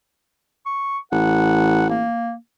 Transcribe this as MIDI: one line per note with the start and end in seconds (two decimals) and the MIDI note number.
0.66 0.98 85
1.12 2.07 33
1.12 1.86 78
1.89 2.35 58